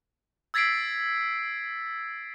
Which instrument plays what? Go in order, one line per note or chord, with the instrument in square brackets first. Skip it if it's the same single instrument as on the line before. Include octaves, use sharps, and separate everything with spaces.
[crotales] E6 G#6 A6 B6 C7 D7